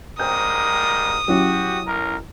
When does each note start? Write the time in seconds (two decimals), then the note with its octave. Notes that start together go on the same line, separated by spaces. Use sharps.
0.20 G#2 G3 A#4 C5 G5 D#6 G6
1.28 F#3 C#4 E4 F#4 G4
1.87 B1 A#4